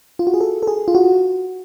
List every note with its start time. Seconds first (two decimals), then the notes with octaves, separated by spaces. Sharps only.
0.19 F4
0.27 F#4
0.34 G#4
0.41 A4
0.63 A4
0.67 G#4
0.88 F4
0.95 F#4